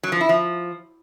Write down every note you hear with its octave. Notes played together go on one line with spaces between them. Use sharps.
F#3
F3
E4
F3